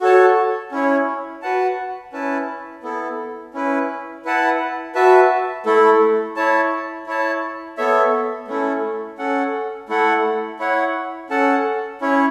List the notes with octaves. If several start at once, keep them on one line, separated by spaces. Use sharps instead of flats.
F#4 A4 C#5 A5
C#4 E4 C#5
F#4 B4 F#5 A5
C#4 E4 B4 A5
B3 E4 A4
C#4 E4 B4
E4 B4 F#5 A5
F#4 B4 E5 A5
A3 E4 A4
E4 C#5 A5
E4 C#5 A5
B3 A4 C#5 E5
A3 C#4 E4 A4
C#4 A4 F#5
A3 E4 A4 F#5
E4 C#5 F#5
C#4 A4 F#5 A5
C#4 E4 C#5